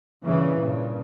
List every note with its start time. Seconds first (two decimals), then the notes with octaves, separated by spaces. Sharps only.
0.23 G2 A#2 C#3 E3
0.59 G2 A#2 C#3